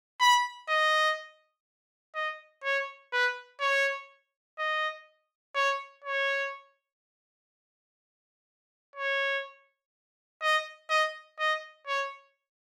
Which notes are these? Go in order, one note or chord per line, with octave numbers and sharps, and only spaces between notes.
B5
D#5
D#5
C#5
B4
C#5
D#5
C#5
C#5
C#5
D#5
D#5
D#5
C#5